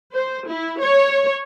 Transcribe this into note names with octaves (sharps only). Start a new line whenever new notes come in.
C5
E4
C#5